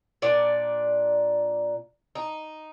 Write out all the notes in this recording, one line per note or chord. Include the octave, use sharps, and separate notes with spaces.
A#2 D4 D5
D#4